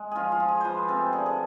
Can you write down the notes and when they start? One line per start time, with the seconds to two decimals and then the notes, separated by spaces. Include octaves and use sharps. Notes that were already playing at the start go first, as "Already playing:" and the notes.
Already playing: G#3
0.11 F3 F4 G#4
0.32 F4
0.40 F3
0.48 G#4
0.61 F3 B4 C5
0.88 C3 A4
1.13 D3 G#4
1.26 G#4